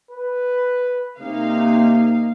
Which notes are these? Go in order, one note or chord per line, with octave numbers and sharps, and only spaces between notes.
B4
C3 A#3 D#4 F5